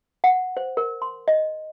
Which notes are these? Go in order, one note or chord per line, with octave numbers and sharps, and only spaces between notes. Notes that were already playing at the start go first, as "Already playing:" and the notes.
F#5
C5
A#4
C6
D#5